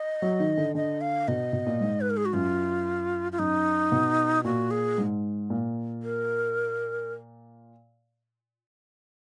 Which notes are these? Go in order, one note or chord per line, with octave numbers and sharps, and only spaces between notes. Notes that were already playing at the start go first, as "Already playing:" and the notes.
Already playing: D#5
F#3
D#3
D3
D3 D#5
F5
B2 D#5
B2
A#2
G#2
B4
A#4
G#4
F#4
F#2 F4
F4
F#2 D#4
B2
A#2 F#4
G#4
G#2
A#2
A#4